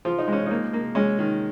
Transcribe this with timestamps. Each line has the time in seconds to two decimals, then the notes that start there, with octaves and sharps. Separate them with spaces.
0.05 F3 F4
0.19 D#4
0.28 G#3 C#4
0.46 A#3 D#4
0.73 A#3
0.95 G#3 C#4
1.19 D#3